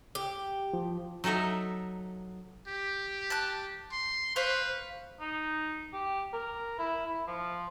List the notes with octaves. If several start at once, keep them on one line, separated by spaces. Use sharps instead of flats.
G4
F3
F#3 D#4 A4 E5 A#5
G4
A5 F#6
C6
B4 C5 F5 C#6
D#4
G4
A#4
E4
E4
F3